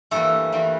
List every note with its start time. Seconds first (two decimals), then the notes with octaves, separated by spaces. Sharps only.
0.11 G2 E3 G3 A3 A#3 A4
0.52 G2 E3 G3 A#3